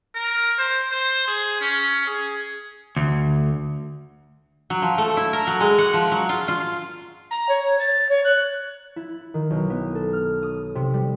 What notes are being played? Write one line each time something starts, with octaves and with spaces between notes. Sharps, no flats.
A#4
C5
C5
G#4
C#4
G#4
D2
F#3
F3
A3
E4
A#4
F#3
G#3
F#5
F3
F#3
F4
F4
A#5
C#5
A6
C#5
F#6
E4
D#3
B1
B3
A4
F6
D#6
C3
G3